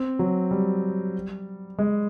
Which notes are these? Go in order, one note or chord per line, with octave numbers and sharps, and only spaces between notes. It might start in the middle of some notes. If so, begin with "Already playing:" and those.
Already playing: C4
F#3
G3
G#3